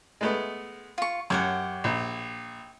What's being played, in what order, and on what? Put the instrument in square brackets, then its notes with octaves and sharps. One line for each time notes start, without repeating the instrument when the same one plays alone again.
[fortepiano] G#3 A3 B3
[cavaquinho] F4 C#6
[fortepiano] F#2 [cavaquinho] G4 C#5 F#5
[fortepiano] A#1